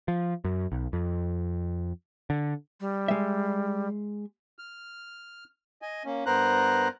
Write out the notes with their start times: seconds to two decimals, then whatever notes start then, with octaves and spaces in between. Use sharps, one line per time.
0.08 F3
0.44 F#2
0.72 B1
0.93 F2
2.30 D3
2.80 G3
3.08 G#3 E5
4.59 F6
5.82 D#5 G#5
6.05 A#3 C#4
6.26 G2 B3 A#4 C5 A#5 F#6